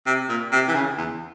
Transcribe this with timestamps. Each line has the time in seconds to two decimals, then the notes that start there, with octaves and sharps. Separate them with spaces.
0.06 C3
0.29 A#2
0.52 C3
0.68 E3
0.75 C#3
0.98 E2